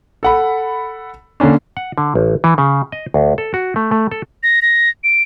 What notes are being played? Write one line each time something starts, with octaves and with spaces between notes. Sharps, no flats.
A4 F#5 B5
D3 A#3 C#4 D4
F#5
D3
A1
E3
C#3
D#5
D2
A4
F#4
A3
A3
A4
A#6
A#6
D7